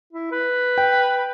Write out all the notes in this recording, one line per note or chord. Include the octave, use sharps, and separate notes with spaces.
E4
B4
G5